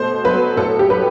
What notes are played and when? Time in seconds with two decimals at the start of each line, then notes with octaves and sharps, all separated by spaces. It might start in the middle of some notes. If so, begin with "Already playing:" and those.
Already playing: B2 A3 C5
0.24 F#3 B4
0.57 A2 A4
0.79 G4
0.89 F#3 B4